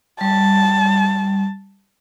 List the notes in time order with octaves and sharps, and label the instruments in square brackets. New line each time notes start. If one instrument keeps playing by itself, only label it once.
[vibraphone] G3 [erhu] A5